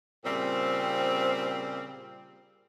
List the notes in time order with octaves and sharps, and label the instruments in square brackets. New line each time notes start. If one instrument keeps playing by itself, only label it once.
[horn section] A#2 C#3 G3 C4